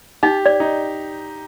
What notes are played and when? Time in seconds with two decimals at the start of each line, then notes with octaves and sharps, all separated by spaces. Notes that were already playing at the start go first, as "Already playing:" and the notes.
0.23 D#4 G4
0.46 D5
0.60 D#4